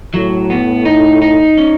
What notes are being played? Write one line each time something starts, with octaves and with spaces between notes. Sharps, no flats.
A2 F#3
B3
D#4
D#4
C#4